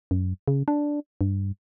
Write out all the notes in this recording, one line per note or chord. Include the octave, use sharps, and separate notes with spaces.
F#2
C#3
D4
G2